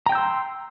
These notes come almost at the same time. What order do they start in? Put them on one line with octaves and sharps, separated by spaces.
A#5 G5 G6 E6 C6